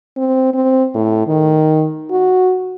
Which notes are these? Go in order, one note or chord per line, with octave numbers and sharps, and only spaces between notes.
C4
C4
A2
D#3
F#4